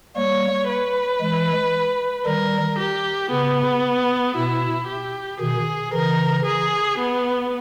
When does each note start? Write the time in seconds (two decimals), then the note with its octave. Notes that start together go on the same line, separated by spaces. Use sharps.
0.16 G3 A#3 C#5
0.69 B4
1.20 E3 G#3
2.26 D#3 G3 A#4
2.78 G4
3.31 C#3 B3
4.36 B2 E4
4.88 G4
5.40 B2 D#3 G#4
5.93 C#3 E3 A#4
6.46 G#4
6.98 B3